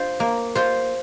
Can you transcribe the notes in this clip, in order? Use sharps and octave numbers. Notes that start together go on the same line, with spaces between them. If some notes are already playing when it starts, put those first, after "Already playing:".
Already playing: F4 C5
A#3
F4 C5